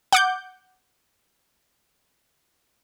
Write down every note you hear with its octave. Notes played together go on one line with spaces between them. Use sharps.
F#5 D6 G6